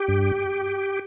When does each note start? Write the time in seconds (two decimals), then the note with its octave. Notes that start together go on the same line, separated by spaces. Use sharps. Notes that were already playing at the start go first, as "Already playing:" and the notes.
Already playing: G4
0.08 G2